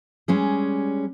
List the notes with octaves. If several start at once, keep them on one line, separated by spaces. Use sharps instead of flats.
G3 G#3 C#4 G#4